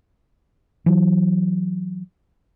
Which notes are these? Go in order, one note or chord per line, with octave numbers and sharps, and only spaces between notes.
E3 F#3